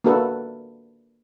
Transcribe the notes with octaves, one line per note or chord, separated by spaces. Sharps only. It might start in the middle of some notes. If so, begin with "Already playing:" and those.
A#3 D4 F#4 A4 B4